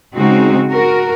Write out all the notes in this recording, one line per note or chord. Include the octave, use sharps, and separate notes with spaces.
C#3 G#3 C4 D#4 F#4
F#4 A#4